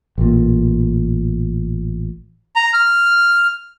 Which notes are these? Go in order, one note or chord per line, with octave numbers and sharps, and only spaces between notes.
A1 A#2
A#5
F6